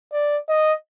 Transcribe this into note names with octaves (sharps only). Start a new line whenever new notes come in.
D5
D#5